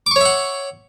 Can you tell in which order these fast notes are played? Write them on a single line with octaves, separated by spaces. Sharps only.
D6 C#6 C#5 E5 F#5